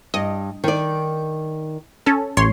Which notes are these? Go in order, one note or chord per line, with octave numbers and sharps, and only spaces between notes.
G2 D#5
D#3 D5
C#4 A4
A1 C#5 C6